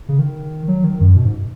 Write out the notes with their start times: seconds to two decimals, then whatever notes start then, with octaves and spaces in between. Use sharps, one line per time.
0.09 C#3
0.19 D#3
0.68 F#3
0.84 D#3
1.00 F#2
1.17 B2
1.25 G#2